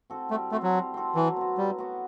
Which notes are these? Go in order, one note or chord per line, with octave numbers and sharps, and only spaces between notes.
C4 F#4 A4
G3 A3
A3 C4 F#4 A4
F#3
G3
C4 F#4 A4
E3 F#3
B3 F#4
F#3 G3
B3 F#4